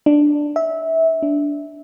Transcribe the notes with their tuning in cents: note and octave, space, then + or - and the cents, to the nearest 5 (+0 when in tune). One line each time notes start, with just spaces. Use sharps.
D4 +5
E5 -20
D4 -15